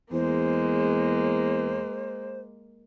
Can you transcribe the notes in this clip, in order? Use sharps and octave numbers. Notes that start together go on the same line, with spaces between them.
E2 G#3 A#3 C5